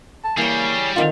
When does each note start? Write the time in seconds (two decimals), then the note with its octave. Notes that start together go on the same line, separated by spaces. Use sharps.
0.24 A5
0.37 E3 G3 A#3 G#4 C#5 G5
0.96 D3 D#3 C4 F4